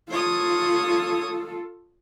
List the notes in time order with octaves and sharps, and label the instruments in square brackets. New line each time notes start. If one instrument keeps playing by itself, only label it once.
[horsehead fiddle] F4 A4 [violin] C#5 D#6